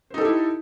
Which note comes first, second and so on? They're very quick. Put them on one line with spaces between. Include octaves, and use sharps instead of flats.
C5 D#4 A4 G4 E4